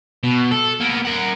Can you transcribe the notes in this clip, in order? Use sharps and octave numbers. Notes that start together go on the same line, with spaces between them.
B2
A4
A#3 B3
A#4 F#5